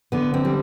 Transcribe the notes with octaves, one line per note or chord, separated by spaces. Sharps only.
D3 B3
C4
G3